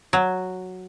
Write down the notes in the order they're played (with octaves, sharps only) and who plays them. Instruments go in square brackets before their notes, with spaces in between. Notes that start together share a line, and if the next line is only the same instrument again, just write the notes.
[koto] F#3